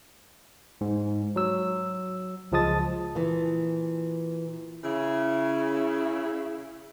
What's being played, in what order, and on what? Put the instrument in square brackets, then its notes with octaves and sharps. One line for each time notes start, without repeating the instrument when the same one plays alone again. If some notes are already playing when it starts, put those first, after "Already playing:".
[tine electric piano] G#2
F#3 E6
C#2 F3 G#3 A5 D#6 A6
[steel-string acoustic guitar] A#2 E3
[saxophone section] C#3 E4